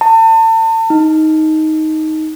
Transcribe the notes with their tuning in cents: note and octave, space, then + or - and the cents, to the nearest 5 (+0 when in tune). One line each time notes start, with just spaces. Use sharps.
A5 +35
D#4 +10